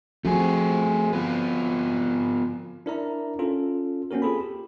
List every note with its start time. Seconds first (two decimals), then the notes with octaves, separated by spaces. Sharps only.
0.25 F3 A3 C4 F#4 G#4
1.13 B3 F4
2.86 D4 E4 A#4 D5 E5 A#5
3.39 C#4 F4 A4
4.11 A#3 C4 C#4 F#4 A#4
4.22 F4 G#4 A4 B5
4.40 G4